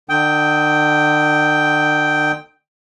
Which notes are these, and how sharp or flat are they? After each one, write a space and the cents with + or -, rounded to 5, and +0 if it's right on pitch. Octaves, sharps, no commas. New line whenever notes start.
D3 +40 G5 +0 D#6 +35